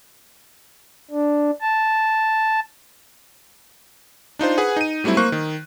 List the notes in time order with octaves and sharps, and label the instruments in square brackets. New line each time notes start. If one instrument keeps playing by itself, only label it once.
[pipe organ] D4
A5
[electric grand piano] D4 D#4 F4 C5
G#4 B4 F#5 G#5
D#4 D#7
F#3 G3 A3 C4 E4
A#3 C5 C#6 F#6
D#3